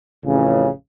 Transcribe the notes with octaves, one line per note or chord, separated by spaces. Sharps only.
A1 F2 C#3